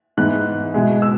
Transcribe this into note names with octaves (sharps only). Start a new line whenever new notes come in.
G#2 E3 B3 F#6
B2 G#3 E4
E6